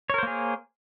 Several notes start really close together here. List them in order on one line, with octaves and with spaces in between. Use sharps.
C#5 A#4 C5 A#3 G#4